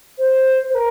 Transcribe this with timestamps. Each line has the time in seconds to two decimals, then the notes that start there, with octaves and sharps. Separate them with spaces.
0.18 C5
0.70 C5
0.74 A#4